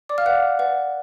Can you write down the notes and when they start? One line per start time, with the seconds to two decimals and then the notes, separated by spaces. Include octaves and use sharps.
0.09 D5 D6
0.18 F5 F6
0.26 B4 D5 F#5 F#6
0.59 B4 D5 F#5